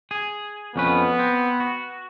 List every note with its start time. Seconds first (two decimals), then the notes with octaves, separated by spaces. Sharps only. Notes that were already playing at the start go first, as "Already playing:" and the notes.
0.11 G#4
0.76 F2 B3 C#4 B4
1.19 C4
1.60 F#4